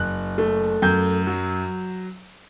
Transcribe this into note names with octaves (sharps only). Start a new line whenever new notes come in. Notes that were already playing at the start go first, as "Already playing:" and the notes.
Already playing: F#1 F#6
A3
F#2 G6
F#3